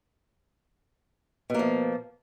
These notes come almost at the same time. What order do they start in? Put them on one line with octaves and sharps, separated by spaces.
B2 A#3 F3